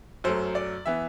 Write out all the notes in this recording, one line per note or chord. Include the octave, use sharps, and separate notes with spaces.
F#2 F#3 A3 C5
D5
E3 B3 E5